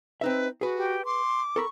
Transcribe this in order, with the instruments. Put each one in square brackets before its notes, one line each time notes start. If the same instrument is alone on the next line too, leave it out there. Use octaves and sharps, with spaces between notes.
[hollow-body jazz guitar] C4 D#4 E5 [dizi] B4
[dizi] F#4 [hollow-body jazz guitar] G#4 B4
[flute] G4
[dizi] C6 [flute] D6
[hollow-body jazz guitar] A4 A#4 B5 [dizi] C#6